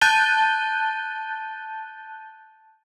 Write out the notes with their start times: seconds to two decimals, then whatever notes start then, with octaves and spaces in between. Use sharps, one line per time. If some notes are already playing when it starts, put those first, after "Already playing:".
0.01 A5 F#6 G6 A6 D#7 G7